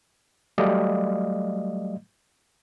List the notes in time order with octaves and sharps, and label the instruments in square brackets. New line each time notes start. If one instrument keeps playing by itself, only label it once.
[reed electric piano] F#3 G3 A3 D5 D#5 F5